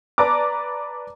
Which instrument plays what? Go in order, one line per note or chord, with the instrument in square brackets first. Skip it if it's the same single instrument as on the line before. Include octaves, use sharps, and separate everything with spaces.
[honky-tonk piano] B4 D5 A5 A#5 D6